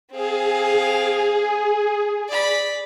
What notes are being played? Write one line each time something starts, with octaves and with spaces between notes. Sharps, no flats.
C4 G#4 F5
D5 B5